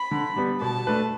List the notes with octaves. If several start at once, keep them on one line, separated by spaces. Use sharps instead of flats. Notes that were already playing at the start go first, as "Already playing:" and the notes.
Already playing: B5
D3
G3 B3
B2 A5
A3 D4 B4